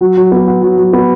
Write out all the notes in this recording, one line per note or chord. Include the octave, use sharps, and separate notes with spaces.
F#3
F#3
B3
F#4
F#3
F#3
B3